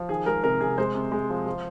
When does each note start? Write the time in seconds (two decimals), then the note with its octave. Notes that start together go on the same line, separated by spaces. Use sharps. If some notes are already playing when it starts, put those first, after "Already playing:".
Already playing: F3
0.09 D#3 G#4
0.26 G#3 A#4
0.44 C3 A#4
0.61 C3 G#4
0.78 G#3 C5
0.95 C3
1.12 G#3
1.30 F3
1.46 F3